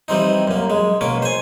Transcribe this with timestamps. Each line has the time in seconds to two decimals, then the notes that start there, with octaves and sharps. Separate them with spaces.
0.08 E3 G3 C4 D#4
0.48 F#2 A#3
0.70 G#3
1.01 B2 A#3 C#4 D6
1.22 C5 G#5